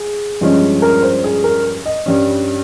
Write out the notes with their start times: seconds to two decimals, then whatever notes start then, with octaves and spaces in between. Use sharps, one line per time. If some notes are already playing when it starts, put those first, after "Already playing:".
Already playing: G#4
0.41 G2 F3 G#3 C#4
0.82 A#4
1.03 C5
1.24 G#4
1.44 A#4
1.86 D#5
2.06 G2 G3 C#4